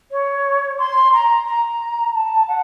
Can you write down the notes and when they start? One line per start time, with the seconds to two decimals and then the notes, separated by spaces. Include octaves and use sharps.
0.11 C#5
0.78 C6
1.12 A#5
1.46 A#5
2.13 A5
2.47 F#5